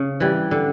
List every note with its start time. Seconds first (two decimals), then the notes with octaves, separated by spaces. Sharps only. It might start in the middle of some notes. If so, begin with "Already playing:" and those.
Already playing: C#3
0.20 E3 G3
0.51 D3